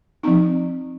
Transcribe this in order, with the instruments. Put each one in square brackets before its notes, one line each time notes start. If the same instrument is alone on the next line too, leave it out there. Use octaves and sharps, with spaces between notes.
[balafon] F3 C4 D#4